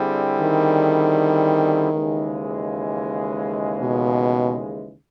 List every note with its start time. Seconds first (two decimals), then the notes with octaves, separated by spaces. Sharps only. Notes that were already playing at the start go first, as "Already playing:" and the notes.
Already playing: D3 G3 C4 E4 G#4
0.40 D#3
1.92 D#2 C#3 E3 G#3
3.81 B2